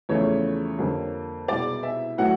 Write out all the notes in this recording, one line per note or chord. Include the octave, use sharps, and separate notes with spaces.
E2 C#3 F3 A3 C#5
F2 D3 G3 A#3
C2 B2 G#3 D5
E5
A2 F#3 A3 F#5